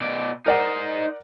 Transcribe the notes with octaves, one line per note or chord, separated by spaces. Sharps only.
B2 D5
D#4 A#4 C5 D5 F#5